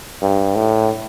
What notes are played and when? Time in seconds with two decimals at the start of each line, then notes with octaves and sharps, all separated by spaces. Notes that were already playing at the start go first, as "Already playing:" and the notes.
0.22 G2
0.55 A2